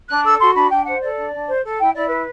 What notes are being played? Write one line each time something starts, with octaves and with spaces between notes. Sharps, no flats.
D4 F#6
A4 E6
F#4 C6
D4 B5
D4 G5
C5 F#5
A4 D5
D4
D4
C5
A4
E4 G5
E4 D5
B4